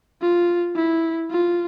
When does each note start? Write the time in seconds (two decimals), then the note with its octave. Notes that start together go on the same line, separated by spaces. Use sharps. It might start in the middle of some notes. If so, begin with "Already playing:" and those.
0.21 F4
0.75 E4
1.30 F4